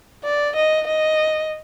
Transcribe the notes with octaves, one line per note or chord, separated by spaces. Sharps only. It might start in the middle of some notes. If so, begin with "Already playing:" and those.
D5
D#5
D#5